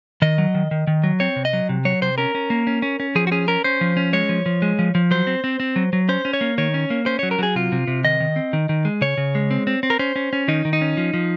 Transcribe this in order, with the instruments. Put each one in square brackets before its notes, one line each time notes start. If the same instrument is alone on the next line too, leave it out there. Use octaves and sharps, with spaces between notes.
[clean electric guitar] D#3 D#5
F#3
D#3
D#3
D#3
F#3
C4 C#5
C3
D#5
F#3
C3
F#3 C#5
C3 C5
C#4 A#4
C#4
A#3
C#4
C#4
C#4
F3 G#4
F#4
C#4 G#4
C#4 A#4
C#4 C5
F3
C#4
G#3 C#5
F3
F3
G#3
F3
F3
F#3 C5
C4
C4
C4
F#3
F#3
C#4 C5
C#4
C#5
A#3
D#3 C#5
C#4
A#3
C#4 C5
F#3 C#5
A#4
F#3 G#4
C3 F4
C3
C3
D#3 D#5
D#3
C4
D#3
D#3
G#3
C#3 C#5
C#3
G#3
C4
C4
C4
A#4
C#4 C5
C#4
C#4
D#3 D#4
D#3
D#4
C#4
F3
F3